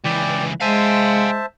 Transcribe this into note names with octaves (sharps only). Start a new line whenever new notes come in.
C#2 E3 D5 G5
G#3 C5 E5 F5 G#5 A5